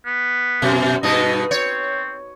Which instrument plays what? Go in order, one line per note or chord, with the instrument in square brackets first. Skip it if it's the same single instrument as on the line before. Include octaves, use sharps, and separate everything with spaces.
[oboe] B3
[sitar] F#2 B2
[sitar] G2 B2 D#4 [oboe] D#5
[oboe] C4 [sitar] C#5